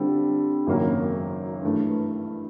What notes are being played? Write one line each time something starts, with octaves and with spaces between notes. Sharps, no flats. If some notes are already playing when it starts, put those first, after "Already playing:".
Already playing: D3 G3 C4 F4 A4
G#1 F#2 C#3 F#3 A#3
G2 E3 A3